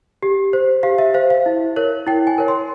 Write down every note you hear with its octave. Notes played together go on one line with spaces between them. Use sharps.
G4
C5
G4 F5
E5
C5 F5
F5
E4
A#4 C#5
E4 G5
G#5
A#4 C#5
C6